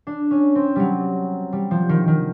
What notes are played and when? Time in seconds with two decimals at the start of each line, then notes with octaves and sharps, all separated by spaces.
0.07 D4
0.31 C#4
0.55 C4
0.76 F#3 G3
1.53 G3
1.71 F3
1.89 D#3
2.08 D#3